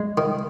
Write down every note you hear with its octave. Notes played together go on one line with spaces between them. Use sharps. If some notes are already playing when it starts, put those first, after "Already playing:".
Already playing: G#3
D#3